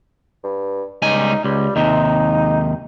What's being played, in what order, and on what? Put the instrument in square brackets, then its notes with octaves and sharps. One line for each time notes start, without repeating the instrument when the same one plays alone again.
[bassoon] G2
[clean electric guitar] C#2 G3 G#5 [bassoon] D#4
[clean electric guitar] C#2 [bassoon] G3
[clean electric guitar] D#2 C3 [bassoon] D#4